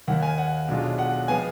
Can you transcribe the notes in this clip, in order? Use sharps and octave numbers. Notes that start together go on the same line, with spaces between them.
D#2 D#3 A#3 F#5
G#5
F#5
B1 B2 G#3 D4 F4
F#5
F3 G#3 B3 G#5